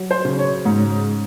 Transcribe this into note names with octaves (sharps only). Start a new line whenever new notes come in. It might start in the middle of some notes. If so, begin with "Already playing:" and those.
Already playing: F#3
C5
C#3
C#5
G#2